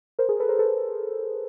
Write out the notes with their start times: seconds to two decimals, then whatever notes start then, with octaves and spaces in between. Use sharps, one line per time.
0.19 A#4 C5
0.29 G#4 A#4
0.40 A4 B4
0.49 A#4 C5
0.59 A4 B4